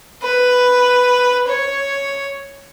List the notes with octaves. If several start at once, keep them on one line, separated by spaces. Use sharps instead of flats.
B4
C#5